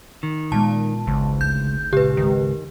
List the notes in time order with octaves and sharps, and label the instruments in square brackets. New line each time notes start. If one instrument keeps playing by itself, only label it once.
[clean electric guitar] D#3
[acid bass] A#2 [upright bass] G#3 B3 [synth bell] A5
[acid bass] G#1 [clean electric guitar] C#2
[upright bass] D2 [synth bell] G6
[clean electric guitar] C#2 [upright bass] A#2 [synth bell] G4 B4
[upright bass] G#1 G#3 [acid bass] D#3